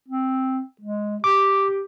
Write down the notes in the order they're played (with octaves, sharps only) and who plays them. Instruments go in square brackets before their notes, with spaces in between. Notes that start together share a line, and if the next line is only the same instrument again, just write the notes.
[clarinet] C4
G#3
[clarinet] G4 [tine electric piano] D6